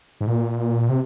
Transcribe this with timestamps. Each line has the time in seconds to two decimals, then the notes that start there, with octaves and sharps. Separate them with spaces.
0.21 G#2
0.27 A#2
0.89 C3